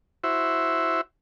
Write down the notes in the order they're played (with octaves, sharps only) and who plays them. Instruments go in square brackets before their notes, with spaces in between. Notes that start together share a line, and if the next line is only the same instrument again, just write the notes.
[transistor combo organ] E4 F#4 C5 E5